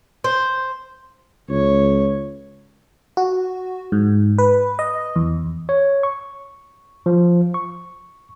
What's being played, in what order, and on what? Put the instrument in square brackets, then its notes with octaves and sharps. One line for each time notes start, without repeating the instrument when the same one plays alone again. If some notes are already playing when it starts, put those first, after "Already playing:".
[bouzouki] C5
[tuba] C#2 [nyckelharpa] C#5
[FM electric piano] F#4
G#2
B4
D#5
E2
[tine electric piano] C#5
C#6
F3
C#6